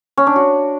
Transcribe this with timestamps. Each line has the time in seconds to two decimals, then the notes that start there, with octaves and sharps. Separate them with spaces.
0.17 C#4
0.27 D4
0.36 F#4